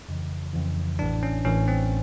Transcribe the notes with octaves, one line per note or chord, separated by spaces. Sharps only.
F2 C#3 E3
F2 C#3 E3
A1 A2 E3 D4
C#4
A1 A2 E3 C#4
C4